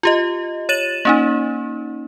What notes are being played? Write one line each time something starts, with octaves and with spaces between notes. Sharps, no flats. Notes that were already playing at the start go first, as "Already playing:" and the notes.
F4 G4 D#5
C#5 A6 D#7 E7 F#7
A#3 C#4 D#4